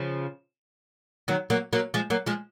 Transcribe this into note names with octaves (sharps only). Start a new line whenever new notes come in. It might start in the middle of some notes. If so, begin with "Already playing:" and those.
Already playing: C#3 F3
D#3 F#3
F#3 A#3
F#3 A#3
F3 G#3
F#3 A#3
F3 G#3